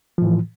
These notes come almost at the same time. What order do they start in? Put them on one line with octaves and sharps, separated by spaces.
F3 A2 E3